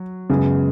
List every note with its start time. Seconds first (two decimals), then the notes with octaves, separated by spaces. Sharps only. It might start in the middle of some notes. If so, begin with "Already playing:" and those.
Already playing: F#3
0.30 F#2 C#3 G#3 B3